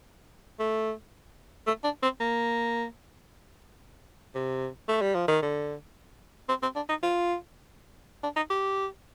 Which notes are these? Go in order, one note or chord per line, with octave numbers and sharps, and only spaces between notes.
A3
A3
D4
C4
A#3
C3
A3
G3
F3
D#3
D3
C4
C4
D4
D#4
F4
D4
D#4
G4